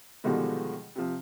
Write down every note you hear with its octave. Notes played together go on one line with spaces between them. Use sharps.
B2 D3 D#3 F3 G3 G#3
C3 F3